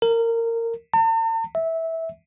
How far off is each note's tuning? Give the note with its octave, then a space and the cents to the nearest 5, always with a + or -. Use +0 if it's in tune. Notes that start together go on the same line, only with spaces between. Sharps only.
A#4 -20
A5 +45
E5 -15